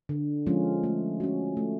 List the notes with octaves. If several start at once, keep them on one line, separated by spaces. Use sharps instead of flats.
D3
F3 G#3 C#4 F4
A3
C#4 F#4
A3